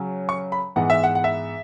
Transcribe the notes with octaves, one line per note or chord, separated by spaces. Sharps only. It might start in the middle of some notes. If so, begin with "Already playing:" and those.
Already playing: C#3 F#3 C#4
C#6
B5
G#2 E3 B3 F#5
E5
F#5
F#5
E5